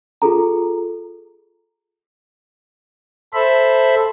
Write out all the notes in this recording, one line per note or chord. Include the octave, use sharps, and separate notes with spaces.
F4 G#4 A4 A#5
A4 C5 E5 B5